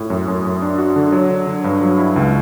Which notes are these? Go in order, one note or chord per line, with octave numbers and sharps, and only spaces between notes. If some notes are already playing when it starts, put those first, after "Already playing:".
Already playing: A2
F#2
F#2
F#2
D4
F#4
D3
F#3
D3
D3
G2
F#3
E4
C#2